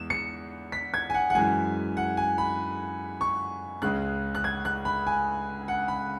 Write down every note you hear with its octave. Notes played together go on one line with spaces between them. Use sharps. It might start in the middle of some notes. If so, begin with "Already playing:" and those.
Already playing: E2 E3 G#3 E7
C#7
B6
G#6
G#5
F#5
F#5
F#2 E3 G#3 G#5
F#5
G#5
B5
C#6
C#2 C#3 G#3 F#6
F#6
G#6
F#6
B5
G#5
F#5
B5